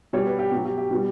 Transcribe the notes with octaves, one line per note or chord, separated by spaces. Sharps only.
B2 G3 C#5
B4
G4
B2 F#4
F#3
G4
G4
B2 G3